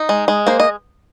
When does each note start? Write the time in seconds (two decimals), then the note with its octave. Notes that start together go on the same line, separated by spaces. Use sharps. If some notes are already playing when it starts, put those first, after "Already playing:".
Already playing: D#4
0.09 G#3
0.28 G#3
0.47 A#3 C5
0.60 D#5